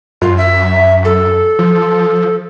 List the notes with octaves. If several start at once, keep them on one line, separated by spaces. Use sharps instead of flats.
F#2 F4
E5
A4
F3